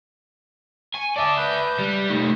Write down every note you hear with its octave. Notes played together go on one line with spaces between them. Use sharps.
G#5 C#6
D5 E5 A5 D6
B4 G6
G3
A#2 A3 D#4